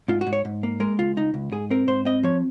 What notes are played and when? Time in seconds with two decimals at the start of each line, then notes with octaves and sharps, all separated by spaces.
0.08 G#2 F4
0.21 F#4
0.27 G#2
0.33 C#5
0.45 G#2
0.63 A#3
0.80 G#3 A#4
0.99 C#2 F4
1.17 C#2 D#4
1.34 C#2
1.52 G#2 G#4
1.70 C4 A#4
1.87 G#2 C5
2.05 C4 D#5
2.23 F3 C#5